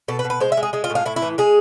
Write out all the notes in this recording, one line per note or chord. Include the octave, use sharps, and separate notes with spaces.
B2 A4
B4
B2
B4
G#3 C5
E5
G#3
G#4
G#3 G#4
F4
A2
F4
A2 E4
E4
E3
G#3 G#4